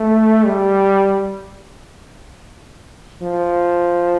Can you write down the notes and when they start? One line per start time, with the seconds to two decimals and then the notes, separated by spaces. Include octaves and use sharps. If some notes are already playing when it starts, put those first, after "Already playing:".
Already playing: A3
0.46 G3
3.21 F3